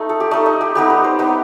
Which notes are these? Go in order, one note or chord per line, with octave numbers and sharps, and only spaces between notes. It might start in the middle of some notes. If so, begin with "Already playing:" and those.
Already playing: A3 D#4
A4
G4
A3 D#4 D#5
D#5
G4
G3 B3 D#4 G4
B4
C5
G3 B3 D#4